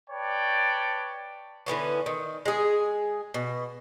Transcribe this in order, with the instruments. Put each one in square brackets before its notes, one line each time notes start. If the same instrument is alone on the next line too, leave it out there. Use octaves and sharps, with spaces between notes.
[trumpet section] B4 C#5 D5 G5 A5
[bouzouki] D3 E3 B3 C#4
D#3
G#3 G#4
B2